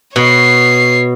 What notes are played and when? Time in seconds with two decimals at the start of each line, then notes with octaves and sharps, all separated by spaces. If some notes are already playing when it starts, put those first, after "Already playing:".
0.16 B2 C#5 C7